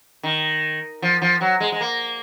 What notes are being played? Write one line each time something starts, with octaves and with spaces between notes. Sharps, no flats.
D#3
F3
F3
F#3
G#3
G#3
A#3